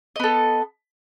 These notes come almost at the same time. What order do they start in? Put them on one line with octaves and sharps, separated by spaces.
D#5 B3 A4